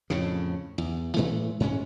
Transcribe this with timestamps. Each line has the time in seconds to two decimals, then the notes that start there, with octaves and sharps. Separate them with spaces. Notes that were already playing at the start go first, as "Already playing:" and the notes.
0.10 F2 A2 C#3
0.78 E2
1.16 A2 E3 G#3 A3
1.60 G#2 G#3 C#4